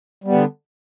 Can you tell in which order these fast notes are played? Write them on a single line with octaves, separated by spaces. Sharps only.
G3 B3 D3